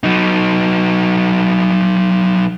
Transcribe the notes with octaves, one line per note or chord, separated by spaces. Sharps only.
F#3 D#4